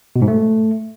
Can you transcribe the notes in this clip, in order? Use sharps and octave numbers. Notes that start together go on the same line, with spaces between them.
B2
G#2
A3